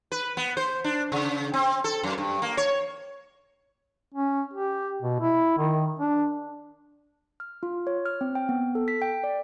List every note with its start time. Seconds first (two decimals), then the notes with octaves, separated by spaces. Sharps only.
0.12 B4
0.37 B3
0.57 C5
0.84 D4
1.12 C#3
1.54 C4
1.84 A4
2.03 F#2
2.18 G2
2.42 A#3
2.57 C#5
4.14 C#4
4.54 G4
5.02 B2
5.20 E4
5.58 D#3
6.00 D4
7.40 F6
7.63 F4
7.87 C#5
8.06 F6
8.21 C4
8.35 G5
8.49 B3
8.75 A4
8.88 B6
9.02 G5
9.24 D5